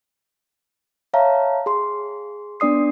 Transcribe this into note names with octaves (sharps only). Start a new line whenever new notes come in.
C#5 E5 F5 A5 A#5
G#4 C6
B3 D4 D5 D#6 C7